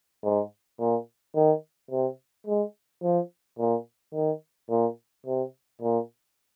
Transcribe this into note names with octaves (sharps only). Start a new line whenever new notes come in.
G#2
A#2
D#3
C3
G#3
F3
A#2
D#3
A#2
C3
A#2